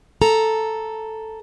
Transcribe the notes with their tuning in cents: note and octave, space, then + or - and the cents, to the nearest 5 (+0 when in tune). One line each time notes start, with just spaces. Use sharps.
A4 +0 A#5 +0